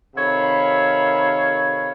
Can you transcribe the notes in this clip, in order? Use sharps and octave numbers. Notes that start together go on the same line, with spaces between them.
C3 D#3 A4 C#5 F5 B5